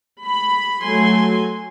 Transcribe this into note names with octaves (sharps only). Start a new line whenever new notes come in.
B5
F#3 A3 G#5 C6